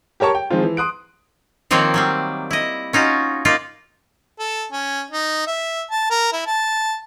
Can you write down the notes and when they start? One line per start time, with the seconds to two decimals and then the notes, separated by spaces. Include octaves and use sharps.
0.20 G4 A#4 C#5 A5 C#6
0.35 G5
0.51 D#3 F3 G#3 C4 F4
0.63 E3
0.77 C6 D#6 F#6 D7
1.71 D#3 F3 A#3 C4 C#5
1.94 F#3 G3 C4
2.51 E4 D#5
2.93 C#4 D#4 F4 F#4
3.45 A#3 D#4 F4 D5
4.39 A4
4.72 C#4
5.10 D#4
5.47 E5
5.91 A5
6.10 A#4
6.32 E4
6.46 A5